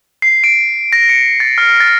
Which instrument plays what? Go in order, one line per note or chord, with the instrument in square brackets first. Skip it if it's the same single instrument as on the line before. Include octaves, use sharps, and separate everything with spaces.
[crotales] C7
D7
A#6
C#7
A6
F6
A6